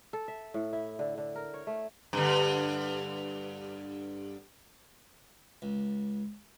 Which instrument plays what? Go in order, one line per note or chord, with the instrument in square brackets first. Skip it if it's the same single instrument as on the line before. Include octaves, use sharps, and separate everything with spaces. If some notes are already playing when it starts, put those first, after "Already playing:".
[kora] A4
E5
A2
E4
D3
D3
A#4
C#5
A3
[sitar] G2 D3
[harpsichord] C#2